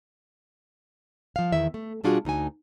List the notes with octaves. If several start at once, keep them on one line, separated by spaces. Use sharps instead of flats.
F3 F5
E2 D#3 E4 E5
A3
B2 G3 D4 F4 F#4 G#4
D2 D#4 F#4 G#5